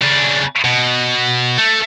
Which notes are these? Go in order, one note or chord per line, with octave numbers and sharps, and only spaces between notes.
C#3 D4
B2
A3